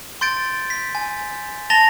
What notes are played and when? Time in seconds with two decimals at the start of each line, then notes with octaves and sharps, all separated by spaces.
0.21 C6 G6 A6 D7
0.70 B6
0.95 G#5
1.70 A5 A6 A#6 F7 G7